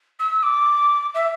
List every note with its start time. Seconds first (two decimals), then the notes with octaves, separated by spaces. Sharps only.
0.19 E6
0.43 D6
1.14 E5